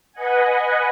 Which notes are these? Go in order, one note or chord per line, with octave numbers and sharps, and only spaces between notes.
B4 D#5 F#5 G#5